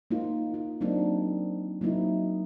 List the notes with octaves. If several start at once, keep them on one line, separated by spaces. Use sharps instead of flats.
A#3 D#4 F4
F4
F#3 A#3 C4 D4 D#4
F#3 A#3 C4 D#4 E4